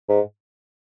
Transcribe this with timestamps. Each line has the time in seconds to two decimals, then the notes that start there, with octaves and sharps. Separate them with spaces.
0.09 G#2